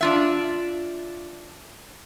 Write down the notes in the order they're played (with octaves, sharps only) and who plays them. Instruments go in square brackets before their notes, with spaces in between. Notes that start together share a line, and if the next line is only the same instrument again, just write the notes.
[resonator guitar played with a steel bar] D4 F4 E5